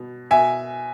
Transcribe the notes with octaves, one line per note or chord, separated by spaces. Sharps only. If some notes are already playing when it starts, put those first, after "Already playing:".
Already playing: B2
B2 E5 G#5